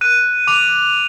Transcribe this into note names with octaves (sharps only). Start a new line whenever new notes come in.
F#6 D#7
D6 F7